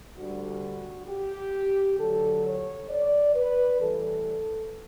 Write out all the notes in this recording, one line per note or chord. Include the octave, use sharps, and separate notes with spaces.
D2 D3 G3 F#4
G4
D2 D3 F#3 A4
C#5
D5
B4
A2 E3 G3 A4